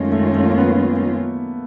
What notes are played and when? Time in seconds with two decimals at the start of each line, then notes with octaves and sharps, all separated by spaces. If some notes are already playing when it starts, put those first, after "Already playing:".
Already playing: F#2 D#3 G#3 A3 C#4 F4
0.12 A3
0.34 A3
0.46 A#3
0.58 B3